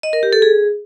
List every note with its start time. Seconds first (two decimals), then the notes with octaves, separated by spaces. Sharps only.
0.03 D#5
0.13 A#4
0.23 G4
0.33 A4
0.42 G#4